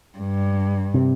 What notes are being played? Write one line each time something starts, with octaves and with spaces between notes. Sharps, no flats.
G2
C3